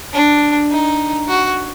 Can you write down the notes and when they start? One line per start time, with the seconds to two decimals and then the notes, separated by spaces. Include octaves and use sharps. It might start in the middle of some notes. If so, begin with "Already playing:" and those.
0.13 D4
0.71 D#4
1.28 F#4